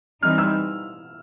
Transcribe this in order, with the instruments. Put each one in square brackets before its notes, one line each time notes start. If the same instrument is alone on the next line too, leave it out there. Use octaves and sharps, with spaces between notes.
[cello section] E3 G3 C4 D#4 [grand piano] F6
[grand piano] E6